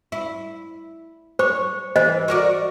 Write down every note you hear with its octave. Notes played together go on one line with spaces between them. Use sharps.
E4
C5 C#5 D6
E3 C5 D#5
F#4 A#4 D5